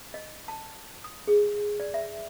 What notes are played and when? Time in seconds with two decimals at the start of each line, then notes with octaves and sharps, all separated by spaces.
0.14 D#5
0.48 A5
1.04 D#6
1.27 G#4
1.80 D5
1.94 E5